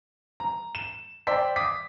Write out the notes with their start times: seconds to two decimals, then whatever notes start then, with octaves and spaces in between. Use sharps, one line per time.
0.40 A#5
0.75 E7
1.27 C5 D5 G5 C6 E6 B6
1.56 D6 D#6 B6